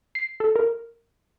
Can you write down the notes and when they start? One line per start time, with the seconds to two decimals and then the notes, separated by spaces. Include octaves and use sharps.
0.15 C7
0.40 A4
0.56 A#4